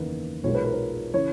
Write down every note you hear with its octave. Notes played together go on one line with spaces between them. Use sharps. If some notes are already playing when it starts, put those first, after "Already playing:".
Already playing: F#1 E2 D#3 A#3 B4
B1 A#2 G#3 B3 C#5
B4
A#4
B4
C#3 E3 C#5